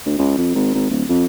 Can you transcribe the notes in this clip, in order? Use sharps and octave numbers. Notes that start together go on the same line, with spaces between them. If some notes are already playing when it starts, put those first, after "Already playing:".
D2
C#2
F2
G#1
G#1
D1
F2